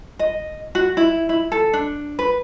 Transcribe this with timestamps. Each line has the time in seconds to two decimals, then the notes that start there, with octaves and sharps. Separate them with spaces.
0.19 D#5
0.75 F#4
0.97 E4
1.29 E4
1.52 A4
1.73 D4
2.19 B4